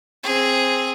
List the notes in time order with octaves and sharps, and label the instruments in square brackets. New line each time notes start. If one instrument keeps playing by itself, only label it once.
[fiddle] C4 G#4